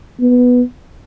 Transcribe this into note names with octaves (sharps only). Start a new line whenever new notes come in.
B3